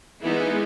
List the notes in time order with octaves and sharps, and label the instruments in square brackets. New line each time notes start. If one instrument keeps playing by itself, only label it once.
[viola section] E3 G#3 B3 D#4 E4